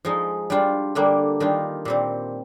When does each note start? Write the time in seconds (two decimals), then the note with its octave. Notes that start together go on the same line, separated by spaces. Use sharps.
0.05 F3 G#3 D#4
0.50 G3 D4 F4
0.95 D3 G3 A#3 D4
1.40 D#3 G3 D4 F4
1.85 A#2 G3 C4